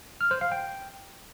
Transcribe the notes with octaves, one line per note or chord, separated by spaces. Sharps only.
F6
C5
F5
G5